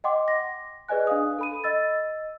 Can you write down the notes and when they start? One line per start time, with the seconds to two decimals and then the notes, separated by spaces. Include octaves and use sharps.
0.04 D#5 F#5 G5 C6 D6
0.28 A#6
0.88 G#4 B4 D5 D#5 G#5 F#6
1.07 D4 F5 D#6
1.39 A4 B5 D#7
1.64 D#5 E6 A6